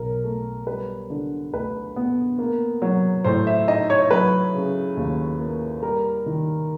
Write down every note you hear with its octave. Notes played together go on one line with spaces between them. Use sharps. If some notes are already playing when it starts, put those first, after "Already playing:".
Already playing: B1 A#4
A3
G3 B4
D3
D2 B4
B3
A#3
F#3
A2 C5
E5
D#4 D#5
C#5
F#3 B4
C#3
D#2
A#3
G3 A#4
D#3